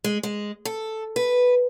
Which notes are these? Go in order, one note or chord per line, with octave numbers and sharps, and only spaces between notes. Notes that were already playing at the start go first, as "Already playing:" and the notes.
G#3
G#3
A4
B4